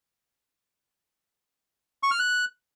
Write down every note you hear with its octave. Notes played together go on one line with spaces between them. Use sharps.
C#6
F6
F#6